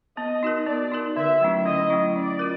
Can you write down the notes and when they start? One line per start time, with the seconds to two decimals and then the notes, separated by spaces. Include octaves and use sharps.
0.17 B3 D#5
0.43 D#4 F#4 A#4
0.66 B3 D5
0.92 D#4 F#4 A#4
1.17 D3 E5
1.41 F#3 A3 C#4 E4
1.65 D3 D#5
1.90 F#3 A3 C#4 E4
2.15 C#4 D5
2.39 F4 A#4